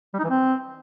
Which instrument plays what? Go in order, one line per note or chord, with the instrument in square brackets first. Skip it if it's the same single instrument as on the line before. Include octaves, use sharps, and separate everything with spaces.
[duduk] G3
D#4
E3
C4